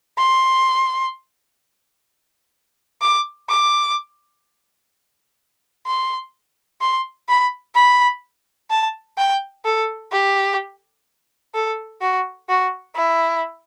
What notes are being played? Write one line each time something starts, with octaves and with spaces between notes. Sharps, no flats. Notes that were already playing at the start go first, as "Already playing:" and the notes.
C6
D6
D6
C6
C6
B5
B5
A5
G5
A4
G4
A4
F#4
F#4
E4